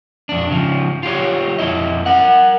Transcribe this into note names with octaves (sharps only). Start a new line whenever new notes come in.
F2 D4
C#3 F3
F4 G4 C#5
F2 E4 D#5
A#4 F#5